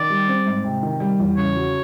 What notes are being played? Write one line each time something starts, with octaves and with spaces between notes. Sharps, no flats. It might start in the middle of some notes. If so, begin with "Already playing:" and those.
Already playing: D#3 D5
G3
C4
G#2
C3
D#3
G3
E2
C#3 C#5
F#3